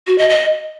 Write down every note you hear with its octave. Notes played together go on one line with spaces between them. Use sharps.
F#4
D#5
D#5